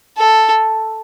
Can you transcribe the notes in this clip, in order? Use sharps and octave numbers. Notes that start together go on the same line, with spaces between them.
A4